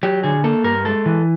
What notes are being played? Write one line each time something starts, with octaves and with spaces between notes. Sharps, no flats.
F#3 G4
D3 G#4
A#3 A4
G2 A#4
G#3 A4
E3